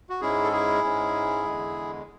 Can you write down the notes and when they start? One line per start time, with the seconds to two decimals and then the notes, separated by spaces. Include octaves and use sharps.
0.10 F#4
0.21 G#2 G#3 C#4 E4 G#4
0.44 A4
0.52 E4 G#4
0.84 G#2 G#3 C#4
1.45 E2 D3 G#3